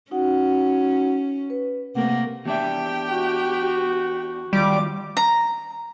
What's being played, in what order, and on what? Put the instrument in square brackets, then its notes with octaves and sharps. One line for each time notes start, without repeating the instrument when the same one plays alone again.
[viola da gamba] C#4 [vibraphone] D#4 F#4 F#5
[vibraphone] B4
[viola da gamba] C3 A3 A#3 [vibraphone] F#5
[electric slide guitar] E2 D4 E5 [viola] G4 G5
[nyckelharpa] F#4
[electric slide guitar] D#3 F#3 [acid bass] G3 [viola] F4 D6
[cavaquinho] A#5